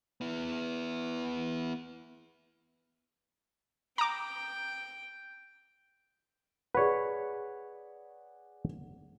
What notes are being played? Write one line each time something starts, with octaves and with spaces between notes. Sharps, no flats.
B3 E4
G5 A#5 D6
G#4 B4 C#5 D5 F#5